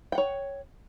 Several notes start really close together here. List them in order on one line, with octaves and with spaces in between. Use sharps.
G5 F#5 C#5